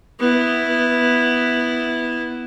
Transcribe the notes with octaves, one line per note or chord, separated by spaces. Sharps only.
B3 E4